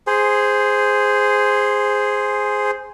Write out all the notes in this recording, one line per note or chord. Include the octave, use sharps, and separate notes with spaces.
G#4 C5